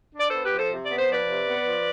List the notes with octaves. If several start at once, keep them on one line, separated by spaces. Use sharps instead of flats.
D4 D5
B3 A4 C5
G4 B4
F3 A4 C5
C3
D5
B3
C5
F3 B4 D5
C3
B3
F3